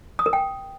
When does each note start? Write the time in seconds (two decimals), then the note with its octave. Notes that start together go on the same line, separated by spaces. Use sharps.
0.19 D#6
0.26 A#4
0.33 G5